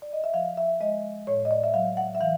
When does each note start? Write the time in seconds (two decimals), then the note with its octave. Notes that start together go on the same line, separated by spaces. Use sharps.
0.02 D5
0.13 D#5
0.24 E5
0.34 F3 F5
0.57 E5
0.81 G#3 D#5
1.27 A2 C#5
1.45 D#5
1.51 D5
1.64 E5
1.74 F#3 F5
1.97 F#5
2.15 E5
2.21 E3 F5